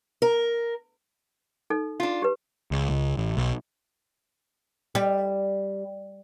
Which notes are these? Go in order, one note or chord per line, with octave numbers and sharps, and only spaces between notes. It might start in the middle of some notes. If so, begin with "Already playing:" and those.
A#4
D#4 A4
D4 F4
G4 B4
C#2
C#2
A1
B1
G3